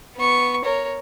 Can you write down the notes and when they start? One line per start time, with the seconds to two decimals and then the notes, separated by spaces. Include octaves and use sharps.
0.16 B3 C#6
0.65 A#4 C#5